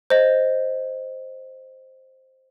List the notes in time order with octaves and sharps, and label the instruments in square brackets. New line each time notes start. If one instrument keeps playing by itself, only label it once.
[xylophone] C5 D#5